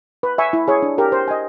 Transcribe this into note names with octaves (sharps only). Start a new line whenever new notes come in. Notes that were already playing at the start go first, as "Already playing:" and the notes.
B4
E5 G#5 C#6
E4
G#4 C#5
D4
G4 A#4
C5
D#5 G#5